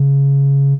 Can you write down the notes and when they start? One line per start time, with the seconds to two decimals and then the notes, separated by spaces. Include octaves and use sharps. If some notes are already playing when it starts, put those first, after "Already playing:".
Already playing: C#3